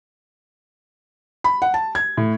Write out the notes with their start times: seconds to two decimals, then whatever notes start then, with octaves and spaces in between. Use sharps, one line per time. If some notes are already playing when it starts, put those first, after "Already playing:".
1.44 B5
1.62 F#5
1.74 A5
1.95 G#6
2.17 A2